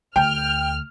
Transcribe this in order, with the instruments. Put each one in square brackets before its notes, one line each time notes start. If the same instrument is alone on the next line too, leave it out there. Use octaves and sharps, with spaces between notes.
[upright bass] D2 [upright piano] G5 [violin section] F6